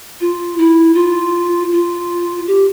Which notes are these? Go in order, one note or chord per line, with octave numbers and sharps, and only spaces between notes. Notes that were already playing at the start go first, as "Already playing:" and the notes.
F4
E4
F4
F4
G4